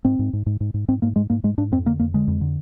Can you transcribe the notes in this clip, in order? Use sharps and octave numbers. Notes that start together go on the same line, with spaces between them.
G#2 C4
G#2
G#2
G#2
G#2
G#2
G#2 C4
G#2 A#3
G#2 G#3
G#2 A#3
G#2 G#3
G#2 D4
F2 C4
D3 A#3
F2 A#3
D3 G#3
F2
D3